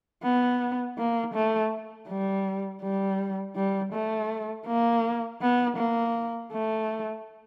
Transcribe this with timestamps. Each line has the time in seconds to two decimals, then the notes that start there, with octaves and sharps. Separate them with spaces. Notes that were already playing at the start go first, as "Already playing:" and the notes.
0.24 B3
0.98 A#3
1.34 A3
2.08 G3
2.82 G3
3.56 G3
3.93 A3
4.66 A#3
5.41 B3
5.77 A#3
6.52 A3